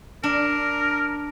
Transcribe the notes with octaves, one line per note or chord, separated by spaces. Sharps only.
D4 A#4